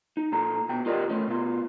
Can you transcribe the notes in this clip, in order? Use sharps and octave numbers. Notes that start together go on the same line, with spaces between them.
D#4
A#2 A4 A#5
B2 G5
F4 G4 A#4 D5 D#5
A3 C#4
B2 F4